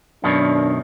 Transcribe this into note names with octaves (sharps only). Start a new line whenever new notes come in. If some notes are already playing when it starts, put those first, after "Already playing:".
F#2 B2 D#3 D4